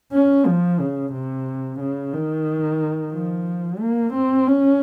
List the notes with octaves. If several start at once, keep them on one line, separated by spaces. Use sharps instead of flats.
C#4
F3
C#3
C3
C#3
D#3
F3
A#3
C4
C#4